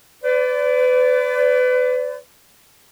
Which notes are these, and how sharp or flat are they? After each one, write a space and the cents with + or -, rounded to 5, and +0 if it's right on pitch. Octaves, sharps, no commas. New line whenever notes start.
B4 +30 D5 -15